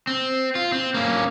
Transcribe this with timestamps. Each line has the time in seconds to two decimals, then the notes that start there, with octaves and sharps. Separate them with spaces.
0.07 C4
0.55 F4
0.72 C4
0.94 A#3 C#4